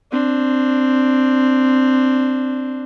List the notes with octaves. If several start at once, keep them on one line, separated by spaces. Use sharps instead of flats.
C4 D4